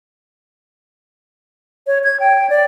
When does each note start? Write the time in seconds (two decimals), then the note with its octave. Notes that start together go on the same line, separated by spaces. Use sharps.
1.87 C#5
2.04 G#6
2.20 G5
2.50 D5